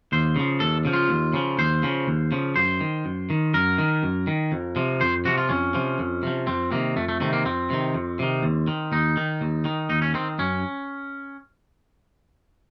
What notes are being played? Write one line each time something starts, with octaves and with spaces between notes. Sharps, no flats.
D#2 C5
C#3 F3
D#2 A4
C#3 F3
F4
D#2
C#3 F3
D#2 C5
C#3 F3
D#2
C#3 F3
F#2 C5
D#3
F#2
D#3
F#2 A#4
D#3
F#2
D#3
F2
C3 F3
F2 C5
C3 F3 F#4
F4
F2 C#4
C3 F3
F2
C3 F3
F2 C4
C3 D#3 A#3
F2 A3
A3
C3 D#3 A3
A#3
F2 C4
C3 D#3
F2
C3 D#3
D#2
D#3
D#2 D#4
D#3
D#2
D#3
D#2 D#4
C#4
D#3 C4
F#2 C#4